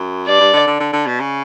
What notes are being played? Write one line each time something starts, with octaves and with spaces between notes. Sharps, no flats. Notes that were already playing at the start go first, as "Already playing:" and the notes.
Already playing: F#2
G2 D5
G2
D3
D3
D3
D3
B2
C#3